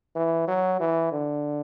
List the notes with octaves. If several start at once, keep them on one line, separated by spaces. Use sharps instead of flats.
E3
F#3
E3
D3